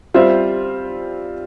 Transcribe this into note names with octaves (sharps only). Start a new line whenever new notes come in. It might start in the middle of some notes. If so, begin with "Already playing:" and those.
G3 C4 F4 C5 E5